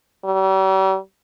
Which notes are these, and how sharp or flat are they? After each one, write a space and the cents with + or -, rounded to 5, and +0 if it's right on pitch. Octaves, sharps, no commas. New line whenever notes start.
G3 -45